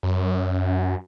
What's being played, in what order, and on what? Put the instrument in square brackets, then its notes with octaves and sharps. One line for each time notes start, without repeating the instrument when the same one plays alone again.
[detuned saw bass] F#2